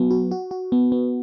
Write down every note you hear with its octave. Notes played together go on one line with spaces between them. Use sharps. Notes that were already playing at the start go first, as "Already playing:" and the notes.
Already playing: F#3 B3 F#4
F#4
F#4
F#4
B3
B3